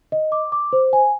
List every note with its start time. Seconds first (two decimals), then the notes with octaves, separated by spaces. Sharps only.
0.12 D#5
0.32 D6
0.52 D6
0.73 C5
0.93 G#5